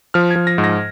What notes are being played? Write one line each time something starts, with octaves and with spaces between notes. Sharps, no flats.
F3 F6
G#6
F3
A#6
G#2
A#6